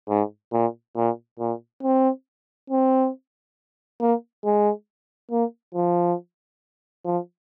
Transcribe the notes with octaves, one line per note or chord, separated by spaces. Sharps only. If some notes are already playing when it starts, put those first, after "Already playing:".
G#2
A#2
A#2
A#2
C4
C4
A#3
G#3
A#3
F3
F3